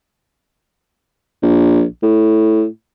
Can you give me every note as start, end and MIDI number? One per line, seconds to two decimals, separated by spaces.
1.43 1.83 34
2.03 2.66 45